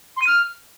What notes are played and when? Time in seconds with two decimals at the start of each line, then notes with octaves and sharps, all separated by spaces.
0.17 C6
0.22 D#7
0.27 F6